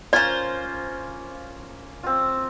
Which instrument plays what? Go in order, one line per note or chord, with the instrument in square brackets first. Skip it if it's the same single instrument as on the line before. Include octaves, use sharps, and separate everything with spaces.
[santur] A#3 C#4 [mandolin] F4 C5 [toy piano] D5
[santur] C4 F4